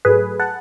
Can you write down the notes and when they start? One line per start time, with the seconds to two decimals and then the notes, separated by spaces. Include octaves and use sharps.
0.05 G#2 F#3 A3 G#4 B4
0.39 F#5 A5